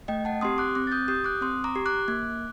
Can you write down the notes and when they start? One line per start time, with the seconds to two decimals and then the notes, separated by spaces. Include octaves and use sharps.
0.08 A3 D#5 G5
0.25 F#5 A5
0.41 C4 G4 C6 D#6
0.58 D6 F#6
0.75 C4 D6 F#6
0.87 A6
0.92 D#6 G6
1.08 G4 D#6 G6
1.24 D6 F#6
1.41 C4 C6 D#6
1.64 A#5 D6
1.75 G4
1.86 D6 F#6
2.08 A#3